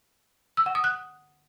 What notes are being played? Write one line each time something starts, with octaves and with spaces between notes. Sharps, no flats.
E6
F#5
D#6
F#6